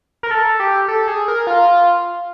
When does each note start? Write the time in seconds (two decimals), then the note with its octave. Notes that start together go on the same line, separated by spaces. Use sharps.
0.23 A#4
0.31 A4
0.60 G4
0.88 A4
1.07 G#4
1.28 A#4
1.47 F4